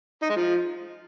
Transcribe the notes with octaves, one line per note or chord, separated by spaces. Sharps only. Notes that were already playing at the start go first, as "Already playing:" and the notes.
D#4
G#3
F3